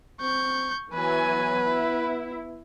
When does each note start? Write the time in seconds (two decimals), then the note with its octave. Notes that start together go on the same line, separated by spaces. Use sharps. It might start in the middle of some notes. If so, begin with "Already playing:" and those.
0.21 C4 C#6 G6
0.94 E3 F#3 B3 B4 G#5
1.66 E4